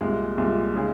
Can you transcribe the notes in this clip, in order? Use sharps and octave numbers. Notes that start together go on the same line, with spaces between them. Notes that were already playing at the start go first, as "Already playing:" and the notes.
C2 A#2 G#3
C2 A#2 G#3
C#3 G#3 D#4 G#4